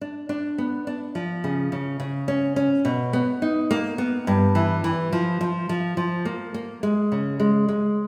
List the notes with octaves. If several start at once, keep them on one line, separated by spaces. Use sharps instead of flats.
D4
D4
B3
D4
F3
C#3
C#3
C#3
C#4
C#4
B2
B3
D#4
A#3
B3
G2
E3
E3
F3
F3
F3
F3
A#3
A#3
G#3
C#3
G#3
G#3